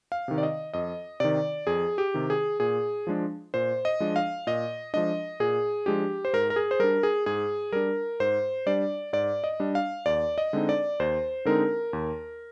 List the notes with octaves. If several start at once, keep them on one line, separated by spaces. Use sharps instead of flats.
F5
C3 D#3
D5
D#5
F2 D#5
C3 D#3 D5
F2 G#4
G4
C3 D#3
G#4
A#2 G#4
F3 G#3 D4
A#2 C5
D#5
F3 G#3 D4
F5
A#2 D#5
F3 G#3 D4 D#5
A#2 G#4
F3 G#3 D4 G4
C5
G#2 A#4
A#4
G#4
C5
G3 D4 A#4
G#4
G#2 G#4
G3 D4 A#4
G#2 C5
G3 D4 D5
G#2 D5
D#5
G3 D4
F5
D#2 D5
D#5
D3 G#3 C4 D#4
D5
D#2 C5
D3 G#3 C4 D#4 A#4
D#2